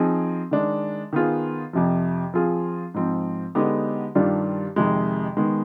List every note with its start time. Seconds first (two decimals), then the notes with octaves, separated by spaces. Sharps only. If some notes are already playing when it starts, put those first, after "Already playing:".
Already playing: F3 C4 D#4 G#4
0.51 D#3 G#3 D4
1.13 D#3 B3 F4 G#4
1.73 F2 C3 F3
2.34 F3 C4 F4 G#4
2.94 G#2 F3 C4
3.55 D3 G#3 B3 D#4 G4
4.15 G2 D#3 G3 D4 F4
4.76 F2 C3 D#3 G#3
5.37 D#3 G#3 B3